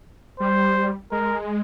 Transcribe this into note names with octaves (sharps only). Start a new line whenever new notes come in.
G3 C5
G#3 A#4